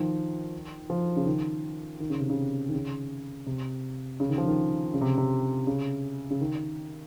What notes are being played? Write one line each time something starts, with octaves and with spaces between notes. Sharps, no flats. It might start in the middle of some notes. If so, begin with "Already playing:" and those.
Already playing: D#3 F3
F3
C#3
D#3
D#3
C#3
C3
C#3
D#3
C#3
C3
C#3
D#3
F3
D#3
C#3
C3
C3
C#3
C#3
D#3